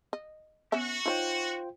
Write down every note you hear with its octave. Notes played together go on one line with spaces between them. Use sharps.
D#5
B3 C#4 F#4 E5
D#4 F4 C5 C#5 G5